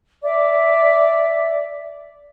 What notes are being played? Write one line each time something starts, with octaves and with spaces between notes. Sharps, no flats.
D5 E5 D6